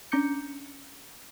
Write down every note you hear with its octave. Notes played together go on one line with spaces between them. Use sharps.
C#4 D4 A#5 D6 G6 C#7